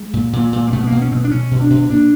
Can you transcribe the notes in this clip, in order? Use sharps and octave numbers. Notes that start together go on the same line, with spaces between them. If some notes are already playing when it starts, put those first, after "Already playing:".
Already playing: G#3
A#2
A#2
A#2
A#3
B2 A3
B3
B2 A#3
C#4
B2 B3 C4
D4
B2 C#4
B2
D4
B2
A#2 D4